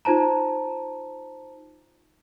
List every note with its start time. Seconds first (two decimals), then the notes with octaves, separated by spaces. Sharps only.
0.05 D#4 F4 C5 A5 A#5